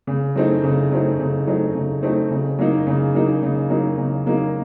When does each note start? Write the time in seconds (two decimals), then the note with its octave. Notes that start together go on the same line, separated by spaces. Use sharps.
0.07 C#3
0.36 F#3 A3 C4 D#4
0.64 C#3
0.91 F#3 A3 C4 D#4
1.20 C#3
1.47 F#3 A3 C4 D#4
1.75 C#3
2.03 F#3 A3 C4 D#4
2.31 C#3
2.59 F#3 A#3 D#4
2.87 C#3
3.14 F#3 A#3 D#4
3.43 C#3
3.70 F#3 A#3 D#4
3.98 C#3
4.26 F#3 A#3 D#4